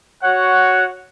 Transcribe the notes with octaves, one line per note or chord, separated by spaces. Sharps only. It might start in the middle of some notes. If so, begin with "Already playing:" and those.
F#4 C#5 F#5